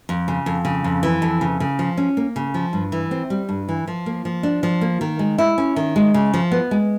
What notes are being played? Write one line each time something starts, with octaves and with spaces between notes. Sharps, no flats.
F2
C#3
F2
C#3
F2
E3
F2
C#3
C#3
F3
C#4
A#3
C#3
F3
G2
E3
C4
G3
G2
E3
F3
A#3
F3
D4
F3
A#3
D#3
G#3
E4
C#4
D#3
G#3
C#3
F3
B3
G#3